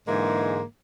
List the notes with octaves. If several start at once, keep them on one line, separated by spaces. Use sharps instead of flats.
G#2 D3 E3 G#3 A#3